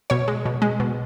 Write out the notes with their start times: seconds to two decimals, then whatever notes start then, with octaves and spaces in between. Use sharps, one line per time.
0.10 B2 C#5
0.28 G#3
0.45 B2
0.62 G#3
0.80 B2